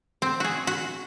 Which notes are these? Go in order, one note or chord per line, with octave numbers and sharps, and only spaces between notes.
C4
F#4 G#4
F#4